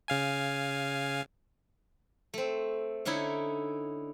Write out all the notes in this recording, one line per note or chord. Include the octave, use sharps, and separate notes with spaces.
C#3 F5 G#5
A3 C4
D3 C#4 D#4 E4 C#5